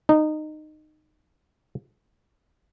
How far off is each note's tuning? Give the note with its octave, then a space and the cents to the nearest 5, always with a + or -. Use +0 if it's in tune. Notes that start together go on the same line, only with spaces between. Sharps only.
D#4 -20